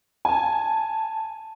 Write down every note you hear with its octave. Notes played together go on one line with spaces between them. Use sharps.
G#5 A5